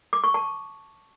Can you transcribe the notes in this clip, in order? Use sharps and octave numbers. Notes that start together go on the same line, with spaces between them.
D6
C#6
A5